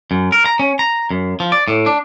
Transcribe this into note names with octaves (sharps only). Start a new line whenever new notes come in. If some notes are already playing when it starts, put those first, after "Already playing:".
F#2
A#4
A#5
C#4
A#5
F#2
F3
D5
A2
D4